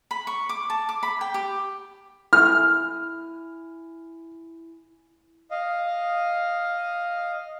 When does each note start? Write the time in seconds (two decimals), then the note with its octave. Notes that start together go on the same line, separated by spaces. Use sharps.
0.11 B5
0.27 C#6
0.49 D6
0.70 A5
0.89 D6
1.03 B5
1.21 G5
1.34 G4
2.33 E4 G#5 F6
5.51 D#5 F5